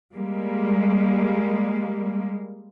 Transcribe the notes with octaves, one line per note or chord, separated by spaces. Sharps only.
G3 G#3 A#3